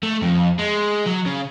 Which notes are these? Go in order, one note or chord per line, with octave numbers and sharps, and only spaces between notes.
A3
F2
G#3
F#3
C#3